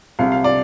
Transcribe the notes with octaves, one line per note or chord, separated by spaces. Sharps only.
C2 C3 G3 F5
F5
D5